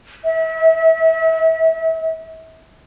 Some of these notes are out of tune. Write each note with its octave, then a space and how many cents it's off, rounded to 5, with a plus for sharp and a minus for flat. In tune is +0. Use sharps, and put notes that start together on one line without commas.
E5 -35